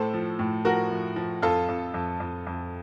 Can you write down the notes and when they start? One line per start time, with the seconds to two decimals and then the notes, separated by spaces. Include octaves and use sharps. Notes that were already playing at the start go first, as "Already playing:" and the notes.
Already playing: A2 A4 C5
0.14 F3
0.39 A2
0.65 F3 F#4 A#4
0.91 F3
1.16 F3
1.42 F2 F4 A4
1.69 F2
1.94 F2
2.20 F2
2.47 F2